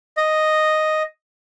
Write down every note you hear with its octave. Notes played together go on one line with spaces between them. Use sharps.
D#5